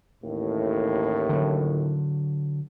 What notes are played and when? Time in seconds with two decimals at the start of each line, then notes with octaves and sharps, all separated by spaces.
0.23 A1 D#2 A2
1.29 D3 F#3